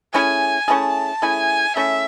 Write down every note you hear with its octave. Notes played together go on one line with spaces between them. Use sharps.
A3 C#4 E4 G#4 G#5
A3 C#4 E4 G#4 A5
A3 C#4 E4 G#4 G#5
A3 C#4 E4 G#4 E5